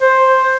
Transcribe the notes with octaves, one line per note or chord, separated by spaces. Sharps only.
C5